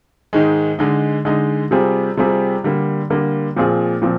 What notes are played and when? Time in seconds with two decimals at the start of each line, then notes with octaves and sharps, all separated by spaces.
0.33 G#2 D#3 G#3
0.79 D3 G#3 D#4
1.25 D3 G#3 D#4
1.71 C3 G3 C4 F4 G#4
2.17 C3 G3 C4 F4 G#4
2.64 D3 G3 A#3
3.10 D3 G3 A#3
3.56 A#2 F3 C4 F4 G#4
4.02 A#2 F3 C4